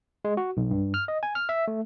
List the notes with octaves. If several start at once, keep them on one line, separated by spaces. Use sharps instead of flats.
G#3
F#4
B1
G2
F6
D#5
G#5
F6
E5
A3